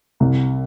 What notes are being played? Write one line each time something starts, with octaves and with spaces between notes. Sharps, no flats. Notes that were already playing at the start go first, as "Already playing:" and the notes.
C2